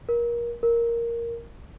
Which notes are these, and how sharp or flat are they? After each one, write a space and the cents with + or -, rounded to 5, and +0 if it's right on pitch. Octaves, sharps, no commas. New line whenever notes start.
A#4 +25
A#4 +0